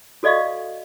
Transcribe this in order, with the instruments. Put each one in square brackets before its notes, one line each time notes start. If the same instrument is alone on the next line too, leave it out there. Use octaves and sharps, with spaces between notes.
[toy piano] F#4 A4 D5 D#5 F5 C#6